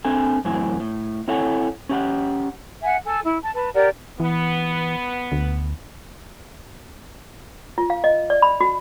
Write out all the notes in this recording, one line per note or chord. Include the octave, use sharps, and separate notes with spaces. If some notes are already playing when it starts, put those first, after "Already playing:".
C4 D4 A4 G#5
F#2 A2 E3 C4 G#5
A2
C4 E4 A4 C#5 F#5 G#5
C#4 G4 F#5
E5 F#5 G#5
A4 G#5
E4
A5
B4 A5
G4 A#4 D5 F#5
E3 B3
D2
F4
F5
D#5
D5
B5
F#4